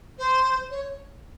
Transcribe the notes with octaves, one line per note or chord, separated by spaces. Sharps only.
C5
C#5